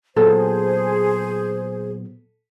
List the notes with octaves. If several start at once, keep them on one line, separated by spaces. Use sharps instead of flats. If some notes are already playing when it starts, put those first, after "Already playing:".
A#2 F#3 B3 G#4 A4 C5